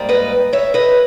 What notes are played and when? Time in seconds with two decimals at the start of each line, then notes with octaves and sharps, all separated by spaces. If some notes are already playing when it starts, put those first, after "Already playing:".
Already playing: G#2 G3 A#3
0.09 B4 D#5
0.53 C#5 E5
0.74 B4 D#5